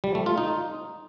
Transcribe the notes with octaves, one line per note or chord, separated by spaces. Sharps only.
G3
A3
F4
D#4